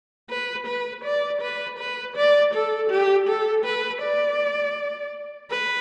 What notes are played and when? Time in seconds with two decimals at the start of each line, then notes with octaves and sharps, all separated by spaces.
0.30 B4
0.66 B4
1.04 D5
1.41 B4
1.78 B4
2.16 D5
2.53 A4
2.90 G4
3.28 A4
3.65 B4
4.02 D5
5.51 B4